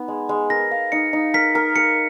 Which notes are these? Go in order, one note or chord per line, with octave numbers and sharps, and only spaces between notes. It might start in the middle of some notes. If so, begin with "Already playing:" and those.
Already playing: B3 D#4
G#3
G#3
A#4 A#6
F5
D#4 C#7
D#4
A#4 B6
A#4
A#4 C#7